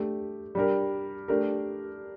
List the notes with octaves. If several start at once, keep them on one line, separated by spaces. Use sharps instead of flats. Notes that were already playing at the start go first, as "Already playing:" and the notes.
Already playing: A3 D4 G4
G3 D4 G4 A#4
A3 D4 G4 A#4